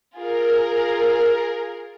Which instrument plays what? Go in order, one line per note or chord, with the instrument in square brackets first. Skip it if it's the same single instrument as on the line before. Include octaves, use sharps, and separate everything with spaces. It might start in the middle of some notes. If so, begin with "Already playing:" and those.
[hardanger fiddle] F4 G#4 [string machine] A#4